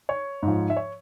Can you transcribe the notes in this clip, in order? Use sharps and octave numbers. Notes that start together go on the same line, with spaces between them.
C#5
G#2
F3
E5
C#5